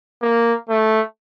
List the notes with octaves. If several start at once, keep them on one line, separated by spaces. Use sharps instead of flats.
A#3
A3